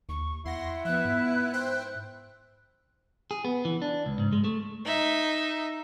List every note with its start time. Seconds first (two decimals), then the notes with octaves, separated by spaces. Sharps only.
0.09 D#2 C#6
0.45 E2 E4 F#5 C6 A#6
0.85 F3 B3 E5 F#6
1.05 G#2
1.53 C5 E5 G5
3.31 G#4
3.45 B3
3.65 E3
3.82 D4
4.06 C#2
4.20 G#2
4.33 G#3
4.44 A3
4.85 D#4 E5